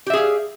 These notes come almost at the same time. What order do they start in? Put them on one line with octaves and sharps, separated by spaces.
G4 E5 G#4 F5